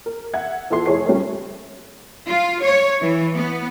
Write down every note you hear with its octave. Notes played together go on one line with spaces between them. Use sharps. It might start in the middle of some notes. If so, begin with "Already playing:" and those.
A#4
E5 F#5 G#6
E2 F4 A4 E5 C6 C7
F1 E4 G#4 C#5 C#6 C7
F3 G3 A3 C#4 A#4 C#5
F4
C#5
E3
B3